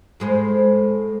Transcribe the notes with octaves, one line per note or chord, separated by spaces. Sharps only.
A2 G#3 C5